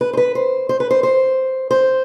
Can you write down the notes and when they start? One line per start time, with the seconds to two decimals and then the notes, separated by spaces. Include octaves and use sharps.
0.01 B4
0.13 C5
0.17 B4
0.35 C5
0.69 C5
0.80 B4
0.91 C5
1.03 C5
1.71 C5